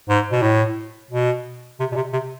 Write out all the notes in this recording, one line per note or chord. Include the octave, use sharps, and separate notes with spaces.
G#2
B2
A2
B2
C3
B2
C3
C3